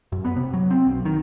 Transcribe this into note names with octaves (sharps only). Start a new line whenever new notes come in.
F#2
B3
C3
F#3
C4
B1
D#3